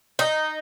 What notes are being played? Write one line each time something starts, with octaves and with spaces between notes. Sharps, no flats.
D#4